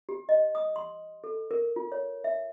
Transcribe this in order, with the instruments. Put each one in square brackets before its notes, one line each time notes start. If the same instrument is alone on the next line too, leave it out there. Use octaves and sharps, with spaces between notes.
[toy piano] G4
D#5
D#6
C6
A4
A#4
F4
C#5
E5